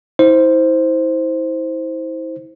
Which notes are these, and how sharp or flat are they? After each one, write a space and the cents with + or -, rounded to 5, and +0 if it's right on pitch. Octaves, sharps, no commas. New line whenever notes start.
E4 -35 C5 +0